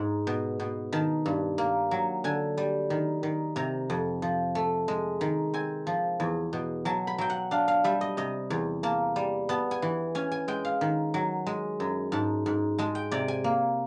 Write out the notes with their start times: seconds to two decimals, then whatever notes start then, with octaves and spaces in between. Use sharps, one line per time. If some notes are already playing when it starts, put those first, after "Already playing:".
Already playing: G#2
0.27 B2
0.60 B2
0.92 D#3 A5
1.26 G2
1.58 A#3
1.91 F#3
2.24 D3 G#5
2.57 G3
2.90 D#3
3.23 D#3
3.56 C3 A#5
3.90 F2
4.22 F3
4.55 A3
4.88 G#3
5.21 D#3
5.54 C4 G#5
5.87 F3
6.20 E2
6.53 B2
6.85 F#3 A5
7.07 B5
7.18 F#3 G5
7.30 F#5
7.51 D4 F5
7.68 F5
7.84 G3 E5
8.01 D#5
8.17 C3 D#5
8.50 E2
8.83 A#3 A5
9.16 G3
9.49 B3 A5
9.71 G#5
9.82 E3
10.15 C#4 G#5
10.32 G#5
10.48 G#3 G5
10.65 F5
10.81 D#3
11.14 F#3
11.46 G#3
11.80 F#2
12.12 G#2 A5
12.46 G#2
12.78 G#3 A5
12.95 G5
13.11 C3 D5
13.28 G#5
13.44 A#3